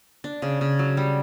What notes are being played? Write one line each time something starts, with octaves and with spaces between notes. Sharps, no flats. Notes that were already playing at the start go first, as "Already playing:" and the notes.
D4
C#3
C#3
F#3
G3